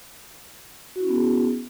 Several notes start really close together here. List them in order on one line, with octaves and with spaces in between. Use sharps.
F#4 E4 C#4 B3 G#4